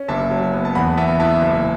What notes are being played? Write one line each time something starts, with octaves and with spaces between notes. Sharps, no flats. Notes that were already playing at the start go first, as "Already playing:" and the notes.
Already playing: C#4
F#1 E5 A5
F#3
B3
A5
E2 F#5 B5
B3 E5 A5
E4 E5 A5
F#1